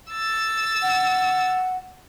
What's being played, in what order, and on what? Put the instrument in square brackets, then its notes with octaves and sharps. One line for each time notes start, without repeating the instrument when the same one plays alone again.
[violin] E6 A6
[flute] F#5